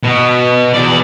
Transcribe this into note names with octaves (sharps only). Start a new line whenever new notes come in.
B2
E2 D5